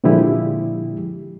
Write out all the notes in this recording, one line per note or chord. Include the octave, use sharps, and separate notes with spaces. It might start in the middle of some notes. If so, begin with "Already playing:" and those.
A#2 D3 F3 G#3 E4 G4